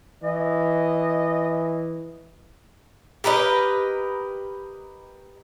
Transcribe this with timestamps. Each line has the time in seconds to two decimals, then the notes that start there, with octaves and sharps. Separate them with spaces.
0.23 E3 D#5
3.24 G4 A#4 B4 D#5